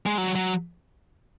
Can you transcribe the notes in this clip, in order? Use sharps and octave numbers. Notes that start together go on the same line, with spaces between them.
G#3
F#3
F#3